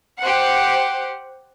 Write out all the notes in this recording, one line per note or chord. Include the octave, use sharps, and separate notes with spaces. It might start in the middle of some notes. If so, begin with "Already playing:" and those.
G4 C5 F#5